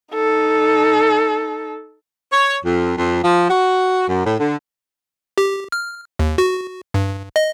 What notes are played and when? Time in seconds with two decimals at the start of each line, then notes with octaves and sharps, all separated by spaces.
0.14 D#4 A4
2.32 C#5
2.65 F2
2.98 F2
3.24 F3
3.50 F#4
4.08 F#2
4.26 A2
4.40 D3
5.38 G4
5.72 F6
6.19 D#2
6.38 F#4
6.94 G2
7.36 D#5